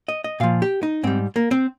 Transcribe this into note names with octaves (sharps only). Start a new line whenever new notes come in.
D#5
D#5
A#2 F3 F5
G4
D#4
G#2 G3 C4
A#3
C4